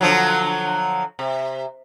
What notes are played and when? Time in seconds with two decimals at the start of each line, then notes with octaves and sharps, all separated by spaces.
0.01 D3 F3 F#3
1.19 C3